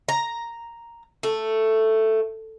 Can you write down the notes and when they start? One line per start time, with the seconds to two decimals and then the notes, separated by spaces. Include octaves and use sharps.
0.09 A#5
1.23 A3